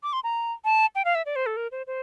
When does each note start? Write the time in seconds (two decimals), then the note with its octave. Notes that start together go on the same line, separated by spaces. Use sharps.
0.03 D6
0.13 C6
0.24 A#5
0.65 A5
0.95 G5
1.05 F5
1.15 E5
1.26 D5
1.36 C5
1.46 A4
1.57 A#4
1.72 C5
1.87 C5